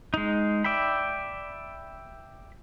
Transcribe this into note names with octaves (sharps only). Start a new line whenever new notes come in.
G#3 D#4
D5 E5 G5 B5